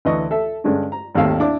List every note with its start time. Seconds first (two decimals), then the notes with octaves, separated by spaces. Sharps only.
0.05 D2 E3 D#5 C#6
0.31 A4 E5
0.64 G2 D3 G#3 C#4 D4
0.92 A#5
1.15 G#1 D#2 D#3 A3 F5 E6
1.40 D4 E4 D6